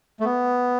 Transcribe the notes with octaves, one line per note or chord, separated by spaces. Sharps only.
A3
B3